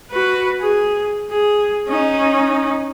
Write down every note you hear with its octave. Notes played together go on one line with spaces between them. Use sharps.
F#4 B4
G#4
G#4
C#4 D#4